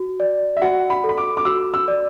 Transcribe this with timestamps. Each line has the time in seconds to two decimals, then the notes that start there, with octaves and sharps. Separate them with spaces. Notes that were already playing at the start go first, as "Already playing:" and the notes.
Already playing: F#4
0.20 D5
0.57 E5
0.62 F#4 F#5
0.90 B5
1.04 A4
1.09 B5
1.17 D6
1.37 D6
1.45 F#4 E6
1.74 E6
1.88 D5